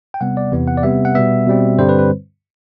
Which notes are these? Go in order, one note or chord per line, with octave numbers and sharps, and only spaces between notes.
G5
C3 G3 B3 F#5
D5
E2 C3 E3 B3
F#5
D5
C3 G3 B3 E5
F#5
B2 G3 B3 E5
B2 G3 C4
G2 D3 G3 C4 C5
B4
B4